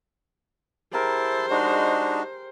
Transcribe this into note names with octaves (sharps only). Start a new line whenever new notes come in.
E4 G4 G#4 A#4 C5 A5
G#3 D4 D#4 F#4